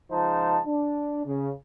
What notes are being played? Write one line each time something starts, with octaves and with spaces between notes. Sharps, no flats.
C#2 F3 D#4 G#4 C5 A5
D4
C#3